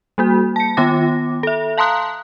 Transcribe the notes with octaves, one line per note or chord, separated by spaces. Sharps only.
G3 A#3 F#4
A5 C#7
D#3 B3 F4 G5 D6 A#6
A4 E5
F5 A5 A#5 C6 D#6 F#6